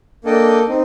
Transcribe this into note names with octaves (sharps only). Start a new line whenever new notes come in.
A#3 D4 A4 D#5 G5
C4 D#4